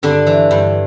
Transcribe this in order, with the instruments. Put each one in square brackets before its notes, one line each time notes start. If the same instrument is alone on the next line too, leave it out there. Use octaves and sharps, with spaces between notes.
[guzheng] G2 D3 D4
E3
G2